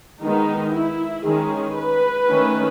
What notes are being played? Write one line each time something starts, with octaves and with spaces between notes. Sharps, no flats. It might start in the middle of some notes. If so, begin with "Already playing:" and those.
D#3 G#3 B3 D#4
E4
D#3 G#3 C#4 G#4
B4
D#3 A3 C#4